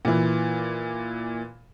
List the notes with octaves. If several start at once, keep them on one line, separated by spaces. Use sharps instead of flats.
A#2 E3